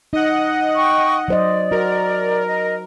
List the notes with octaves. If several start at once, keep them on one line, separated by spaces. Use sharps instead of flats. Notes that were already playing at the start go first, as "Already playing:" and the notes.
D#4 D#5 F#5
G5 C#6
F#3 C5 D5 D#5
F#4 A#4
D#5